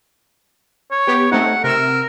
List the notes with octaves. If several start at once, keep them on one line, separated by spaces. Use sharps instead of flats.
C#5
B3 G4
A3 C4 D#4 F#5
C3 A#4 E6